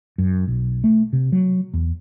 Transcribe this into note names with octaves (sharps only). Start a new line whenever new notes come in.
F#2
B1
A3
C3
F#3
E2